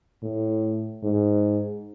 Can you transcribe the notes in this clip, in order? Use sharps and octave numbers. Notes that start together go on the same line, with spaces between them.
A2
G#2